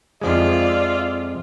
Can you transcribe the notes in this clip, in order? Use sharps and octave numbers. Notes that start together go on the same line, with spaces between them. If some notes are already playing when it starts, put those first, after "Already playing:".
F2 F3 G#3 F4 D5 E5